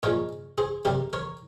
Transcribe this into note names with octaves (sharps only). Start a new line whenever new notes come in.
A#2 F3 G#3 A#4 C#5
G#4 C5
C3 G3 G4 A#4
A#4 C#5